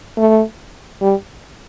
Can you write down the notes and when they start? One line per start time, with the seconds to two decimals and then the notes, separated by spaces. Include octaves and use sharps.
0.17 A3
1.01 G3